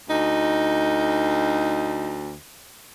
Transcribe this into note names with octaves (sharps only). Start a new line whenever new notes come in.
D2 D#4